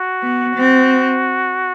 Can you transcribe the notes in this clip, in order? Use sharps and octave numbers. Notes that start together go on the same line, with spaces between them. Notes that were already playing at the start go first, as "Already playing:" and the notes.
Already playing: F#4
B3
C4